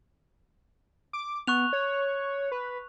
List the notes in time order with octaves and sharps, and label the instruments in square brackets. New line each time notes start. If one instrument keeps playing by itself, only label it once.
[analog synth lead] D6
[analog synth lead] B3 [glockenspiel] C#6 F#6 F7
[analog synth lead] C#5
B4